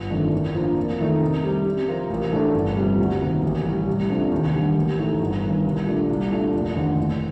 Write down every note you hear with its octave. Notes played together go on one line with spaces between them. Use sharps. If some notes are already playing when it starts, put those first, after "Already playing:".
Already playing: G1
F2 D#3 A3 D4
A2
F3 A#3 D4
F2
D#3 A3 D#4
C3
G3 C4 G4
C3
F3 C4 F4 A#4
A1
A2 A3 D4 A4
G1
F2 C3 G3
D2
C3 D#3 A#3
A1
A2 G3
C2
C3 F3 A3 D4
D#2
D3 G3
A1
A2 A3 D#4
G1
G2 D#3
C2
A#2 A3 D4
C2
A#2 A3 D4
F1
D#2 D3 F3
A2